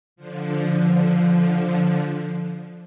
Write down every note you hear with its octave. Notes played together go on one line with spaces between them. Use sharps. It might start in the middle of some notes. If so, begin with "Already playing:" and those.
D3 F3